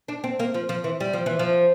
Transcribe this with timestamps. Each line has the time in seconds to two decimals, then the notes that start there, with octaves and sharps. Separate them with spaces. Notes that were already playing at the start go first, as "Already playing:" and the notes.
0.08 D4
0.24 C4
0.39 A#3
0.54 F3
0.69 F3
0.84 E3
1.00 G3
1.13 F3
1.26 E3
1.39 F3